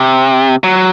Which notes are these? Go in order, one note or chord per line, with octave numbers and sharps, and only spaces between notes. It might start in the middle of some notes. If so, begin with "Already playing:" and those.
Already playing: C3
F#3